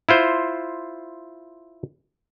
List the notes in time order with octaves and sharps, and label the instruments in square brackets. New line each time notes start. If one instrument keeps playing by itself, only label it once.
[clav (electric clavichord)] E4 F4 C5